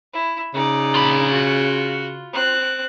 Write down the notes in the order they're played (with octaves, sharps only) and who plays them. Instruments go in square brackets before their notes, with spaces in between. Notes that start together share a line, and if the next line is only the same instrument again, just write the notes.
[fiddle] E4
[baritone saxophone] C#3 [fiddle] D#4 D5
[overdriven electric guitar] F4 B5
[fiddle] F#4
C4 F#6